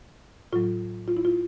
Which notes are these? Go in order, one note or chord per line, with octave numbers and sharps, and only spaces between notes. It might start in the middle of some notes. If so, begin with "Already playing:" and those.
A2 F#3 F4
F4
E4
F4